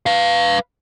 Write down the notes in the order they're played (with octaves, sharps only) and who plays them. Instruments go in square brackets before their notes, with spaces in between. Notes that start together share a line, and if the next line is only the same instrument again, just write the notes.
[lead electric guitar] B4 F5